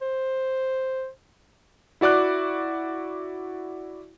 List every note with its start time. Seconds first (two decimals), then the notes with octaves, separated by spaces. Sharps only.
0.01 C5
2.01 E4 F#4 D5 D6 F#6